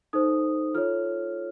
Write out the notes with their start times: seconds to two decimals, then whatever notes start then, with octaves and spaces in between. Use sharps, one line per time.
0.13 D#4 A4 C5 D#6
0.74 F4 A4 C#5 F6